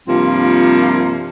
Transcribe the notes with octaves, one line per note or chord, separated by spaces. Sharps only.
G2 C3 F3 A#3 C4 F4